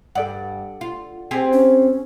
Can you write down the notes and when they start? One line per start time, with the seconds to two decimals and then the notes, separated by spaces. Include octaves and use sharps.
0.15 G2 A4 D5 F#5
0.81 F4
1.31 C4 G4 G#4
1.53 C#4